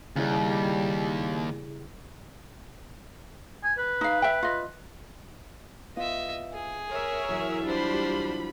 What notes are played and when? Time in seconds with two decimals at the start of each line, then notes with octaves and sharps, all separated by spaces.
0.16 D#2 C#3 G3 E4 G#4
3.63 G#5
3.78 B4
4.01 D#4 F5
4.22 E5 G5
4.43 F4 D#5
5.96 B3 F4 D#5 E5
6.53 G#4
6.89 A#4 C#5 E5
7.29 E3 F#3
7.65 G3 D4 F4 C5 B5